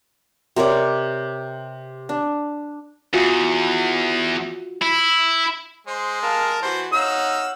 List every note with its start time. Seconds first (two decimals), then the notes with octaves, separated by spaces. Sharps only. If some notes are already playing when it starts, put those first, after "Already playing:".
0.56 C3 A#4 C#5 D5
2.09 D4
3.14 E2 F4 F#4
4.82 E4
5.87 G#3 C5
6.22 A#4 F5 A5
6.62 E3 F#4 C5
6.93 D#4 C#5 F5 F#5 E6